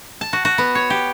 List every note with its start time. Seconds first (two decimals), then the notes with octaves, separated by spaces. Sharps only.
0.21 A5
0.33 F#4
0.45 F#4
0.58 B3
0.75 C#5
0.90 G4